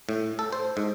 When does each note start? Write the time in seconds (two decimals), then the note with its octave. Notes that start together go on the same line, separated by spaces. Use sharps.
0.09 A2
0.39 A4
0.52 C5
0.77 G#2